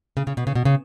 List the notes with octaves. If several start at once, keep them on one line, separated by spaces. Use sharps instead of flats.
C#3
C#3
B2
C#3
B2
C#3